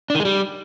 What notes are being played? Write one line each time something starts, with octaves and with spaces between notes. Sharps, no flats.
D4
D#3
G#3
G3